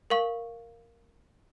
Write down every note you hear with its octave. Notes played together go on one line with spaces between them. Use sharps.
A#4 F5 C#6